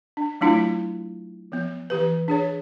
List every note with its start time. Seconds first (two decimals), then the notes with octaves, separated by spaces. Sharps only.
0.17 D4
0.41 F#3 A3 D4 E4 F4
1.52 F3 B3
1.90 E3 G4 B4
2.28 D4 G#4 C#5